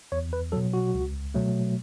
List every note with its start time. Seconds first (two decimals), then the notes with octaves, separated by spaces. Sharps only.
0.12 E2 C#5
0.33 B4
0.52 B2 F#3 A4
0.73 F#4
0.94 C#2
1.34 B2 F#3 A3